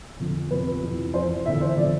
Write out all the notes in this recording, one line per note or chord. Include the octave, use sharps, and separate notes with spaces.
F2 D3 F3
F2 C3 F3 B4
F2 C3 E3
F2 E3 C5
E2 D3 F3 E5
C5
D3 F3 D5